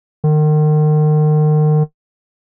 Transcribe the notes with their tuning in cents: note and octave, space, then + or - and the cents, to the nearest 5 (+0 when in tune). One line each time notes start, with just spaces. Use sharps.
D#3 -35